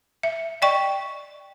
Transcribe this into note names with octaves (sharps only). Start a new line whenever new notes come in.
E5
D5 D#5 G5 C#6